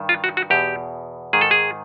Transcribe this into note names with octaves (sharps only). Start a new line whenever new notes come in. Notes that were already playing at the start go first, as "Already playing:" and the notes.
Already playing: G2 D#3
F4
F#4
F#4
E2 B2 G4
G#2 D#3 G#4
A4
G#4